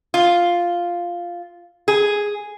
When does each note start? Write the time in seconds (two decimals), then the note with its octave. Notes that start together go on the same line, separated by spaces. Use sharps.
0.14 F4
1.88 G#4